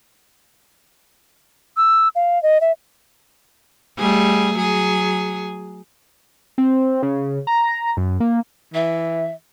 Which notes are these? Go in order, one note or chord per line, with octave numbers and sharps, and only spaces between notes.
E6
F5
D#5
E5
G3 A3 G#4
F#3 G#4
C4
C#3
A#5
F#2
A#3
E3 E5